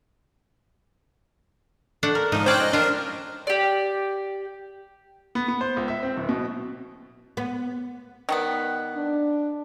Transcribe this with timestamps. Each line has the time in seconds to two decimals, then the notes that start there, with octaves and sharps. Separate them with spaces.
2.03 A3 D4 F#5
2.15 A#4
2.32 G#2 F3 D#4
2.46 C#4 F4 C5 D5 G5 F#6
2.60 D#5
2.73 D4 F4 A#4
3.47 G4 D5
5.35 B3
5.48 B3
5.61 C5
5.77 C#2
5.88 E5
6.03 C4
6.17 D1
6.29 B2
7.37 B3
8.29 D#3 G3 B3
8.96 D4